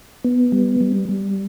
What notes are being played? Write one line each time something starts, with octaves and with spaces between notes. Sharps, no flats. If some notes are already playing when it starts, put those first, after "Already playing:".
B3
G3
G3
G3